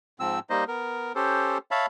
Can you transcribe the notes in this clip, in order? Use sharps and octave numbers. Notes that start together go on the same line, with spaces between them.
G#2 F3 C4 E6
G3 A#3 D#4 C5 D#5
B3 A#4
C#4 G4 A4 C5
C#5 E5 F5 A5 B5